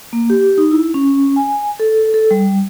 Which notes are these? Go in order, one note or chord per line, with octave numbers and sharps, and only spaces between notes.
A#3
G4
D#4
E4
C#4
G#5
A4
A4
G3